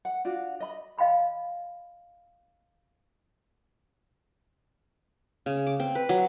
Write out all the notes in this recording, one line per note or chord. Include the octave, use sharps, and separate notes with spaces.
F#5
D4 F4 F#4
D#5 B5
D#5 F5 G5 B5 C6
C#3
D6
C4
B4
F#3